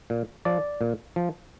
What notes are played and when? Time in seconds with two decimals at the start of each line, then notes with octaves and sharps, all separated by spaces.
0.10 A#2
0.45 F3 D5
0.81 A#2
1.16 F3